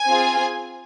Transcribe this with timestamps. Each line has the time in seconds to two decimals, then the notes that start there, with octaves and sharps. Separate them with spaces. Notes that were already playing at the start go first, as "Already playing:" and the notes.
Already playing: G#5
0.08 C4 F4 G#4